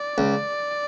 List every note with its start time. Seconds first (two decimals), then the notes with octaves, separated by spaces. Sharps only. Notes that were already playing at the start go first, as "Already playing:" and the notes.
Already playing: D5
0.18 C#2